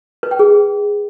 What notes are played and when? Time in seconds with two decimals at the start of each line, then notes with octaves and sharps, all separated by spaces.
0.23 B4
0.31 G5
0.39 G#4